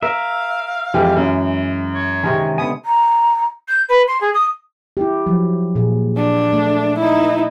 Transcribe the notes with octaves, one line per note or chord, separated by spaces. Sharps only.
A#4 E5 F5
F2 E3 G#3 G4
F#2
C#5
C3 D#3 G#3 C#4
D3 B3 G#5 D#6
A#5
G6
B4
C6
G#4
D#6
E4 G4
F3 F#3
A#2 G#4
D4
A3
D#4 E4